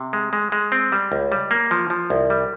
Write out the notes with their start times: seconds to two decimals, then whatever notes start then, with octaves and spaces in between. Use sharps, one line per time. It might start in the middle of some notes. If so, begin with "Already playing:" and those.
Already playing: C3
0.13 G#3
0.33 G#3
0.52 G#3
0.72 C4
0.92 G3
1.12 C#2
1.32 G3
1.51 A#3
1.71 F3
1.90 F3
2.10 C2
2.30 G3